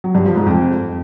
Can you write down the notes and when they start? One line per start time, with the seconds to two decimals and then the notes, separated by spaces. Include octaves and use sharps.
0.04 F#3
0.15 G2
0.25 F3
0.36 G#2
0.46 F2